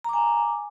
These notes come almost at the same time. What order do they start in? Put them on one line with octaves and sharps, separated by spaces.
A#5 D6 G#5